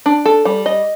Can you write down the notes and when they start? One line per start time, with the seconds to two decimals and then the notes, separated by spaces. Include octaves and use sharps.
0.06 D4
0.25 A4
0.45 G3
0.66 D#5